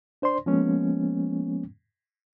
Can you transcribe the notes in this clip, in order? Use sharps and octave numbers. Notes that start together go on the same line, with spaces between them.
D4 C5 D5 C6
F3 G#3 A#3 B3 C#4